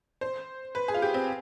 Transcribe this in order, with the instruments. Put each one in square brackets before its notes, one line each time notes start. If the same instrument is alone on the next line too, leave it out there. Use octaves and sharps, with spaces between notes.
[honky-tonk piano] C5
B4
G#4
F4
G4
C4